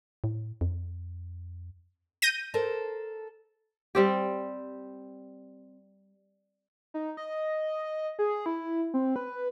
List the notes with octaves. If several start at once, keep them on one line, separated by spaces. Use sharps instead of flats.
A2
F2
G6 A#6 D#7
A4 A#4 C5
G3 C4 G4
D#4
D#5
G#4
E4
C4
B4